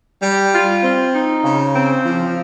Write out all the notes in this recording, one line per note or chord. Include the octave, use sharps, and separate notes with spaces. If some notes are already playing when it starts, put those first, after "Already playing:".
G3
F4
C4
D#4
C#3
C4
F3